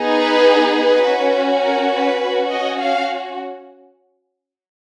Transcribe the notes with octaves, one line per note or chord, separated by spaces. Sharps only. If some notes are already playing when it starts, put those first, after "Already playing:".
Already playing: B3 D#4 G#4
B4
B4
C#4 F#4
A#4
B4
C#4 F#4
D#5
F5